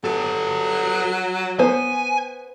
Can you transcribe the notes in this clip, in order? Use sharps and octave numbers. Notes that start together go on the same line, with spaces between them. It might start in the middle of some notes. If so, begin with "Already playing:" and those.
F#3 G4 A4
B3 C5 G#5